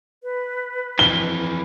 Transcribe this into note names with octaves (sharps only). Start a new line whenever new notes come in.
B4
F2 E3 G7